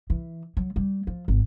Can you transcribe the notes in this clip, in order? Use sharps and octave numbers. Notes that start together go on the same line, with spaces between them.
E3
F#3
G3
F3
G#1